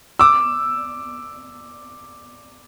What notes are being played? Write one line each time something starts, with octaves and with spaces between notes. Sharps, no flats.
D6 E6